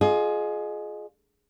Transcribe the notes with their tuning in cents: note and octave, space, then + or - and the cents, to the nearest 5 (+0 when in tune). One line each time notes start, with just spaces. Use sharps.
F4 +15 G#4 +25 D#5 -20